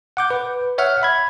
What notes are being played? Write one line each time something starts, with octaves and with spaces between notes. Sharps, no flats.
F#5 D6 G6
B4
C#5 E5 F#5 F6
E5 B5 G#6